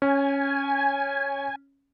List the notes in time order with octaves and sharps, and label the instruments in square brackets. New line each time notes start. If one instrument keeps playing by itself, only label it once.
[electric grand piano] C#4 [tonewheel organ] G#5